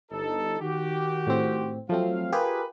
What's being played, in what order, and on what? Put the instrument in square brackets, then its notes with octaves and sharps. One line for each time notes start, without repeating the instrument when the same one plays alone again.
[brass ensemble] G1 D#4 A4
D#3 F#4 G4
[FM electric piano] A2 C4
[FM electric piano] F3 A3 C4 [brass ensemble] F#3 F5
[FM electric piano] F4 G4 G#4 [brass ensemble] A#4 B4